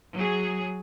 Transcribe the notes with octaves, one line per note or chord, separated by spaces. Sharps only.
F#3 G#4